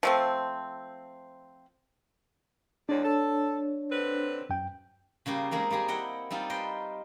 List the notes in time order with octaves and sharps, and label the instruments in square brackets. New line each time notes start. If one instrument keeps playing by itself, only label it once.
[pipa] F3 A3 C4
[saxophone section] E2 G#3 D5 [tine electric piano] D4 C#5
[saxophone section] A4
D3 C4 B4
[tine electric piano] F#2 G5
[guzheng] C#3 G3 A#3 G4
G#3 A#3 C4 D#4
G3 A#3 G4 G#4
E4 D#5 F#5 G5
G3 C4 D#4 F4 G4
B4 C5 D#5 G5